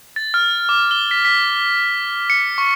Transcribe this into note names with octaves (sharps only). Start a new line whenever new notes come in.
A6
F6
D6
G7
B6
B6
C#7
C#6